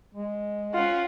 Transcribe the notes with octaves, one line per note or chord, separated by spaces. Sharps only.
G#3
C#4 F4 F#5